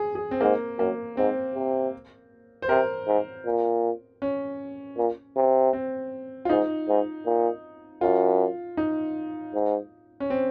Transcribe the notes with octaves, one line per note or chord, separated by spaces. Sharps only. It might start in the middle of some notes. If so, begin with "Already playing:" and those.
Already playing: G#4
G#4
C4
G#2 A#3
F#2 A#3
G#2 C4
C3
C5
C3 A#4
G#2
A#2
C#4
A#2
C3
C4
F4
G#2 D#4
G#2
A#2
F#2 F4
D#4
G#2
C#4
C4